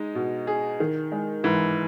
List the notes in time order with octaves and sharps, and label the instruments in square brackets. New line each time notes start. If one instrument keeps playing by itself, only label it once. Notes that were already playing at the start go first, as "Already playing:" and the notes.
Already playing: [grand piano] G#3 [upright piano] D#4
[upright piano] B2
G#4
D#3
G#3
[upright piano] G#2 [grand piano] E3